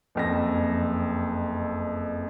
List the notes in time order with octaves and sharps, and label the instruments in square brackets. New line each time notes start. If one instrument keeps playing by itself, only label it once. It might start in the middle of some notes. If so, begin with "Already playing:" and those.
[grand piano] F#1 F2 A#6